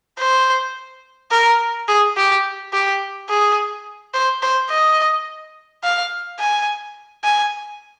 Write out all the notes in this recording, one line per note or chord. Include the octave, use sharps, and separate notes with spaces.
C5
A#4
G#4
G4
G4
G#4
C5
C5
D#5
F5
G#5
G#5